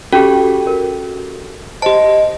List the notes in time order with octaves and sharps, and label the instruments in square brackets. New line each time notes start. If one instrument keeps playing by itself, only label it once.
[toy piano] C#4 G4 [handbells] F#4 A4
[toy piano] A#4
[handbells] G4 A5 [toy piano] C5 [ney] D#5